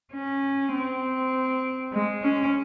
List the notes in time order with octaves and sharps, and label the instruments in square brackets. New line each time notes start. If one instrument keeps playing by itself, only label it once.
[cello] C#4
C4
G#3
C#4